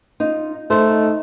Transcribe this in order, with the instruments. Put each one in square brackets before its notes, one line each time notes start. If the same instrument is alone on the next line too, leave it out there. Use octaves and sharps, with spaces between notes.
[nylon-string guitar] D#4 F4
[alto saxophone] A3 [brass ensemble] D#4 [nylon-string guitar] A4 C5